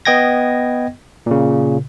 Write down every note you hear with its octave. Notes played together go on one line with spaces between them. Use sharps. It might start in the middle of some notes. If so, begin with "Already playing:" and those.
B3 D#5 G5 G#6 A#6
A#2 C#3